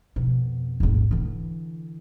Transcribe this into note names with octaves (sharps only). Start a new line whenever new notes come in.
F2 B2
D#1 G#1
D3 E3